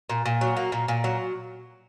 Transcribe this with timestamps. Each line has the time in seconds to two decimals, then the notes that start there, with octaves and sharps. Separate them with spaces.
0.09 A#2
0.26 A#2
0.41 F#3
0.57 A#3
0.72 A#2
0.88 A#2
1.04 F#3